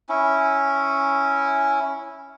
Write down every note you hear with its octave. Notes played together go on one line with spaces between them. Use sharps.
C#4 E4